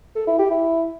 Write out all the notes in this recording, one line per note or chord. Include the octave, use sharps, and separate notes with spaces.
A4
E4
G4
E4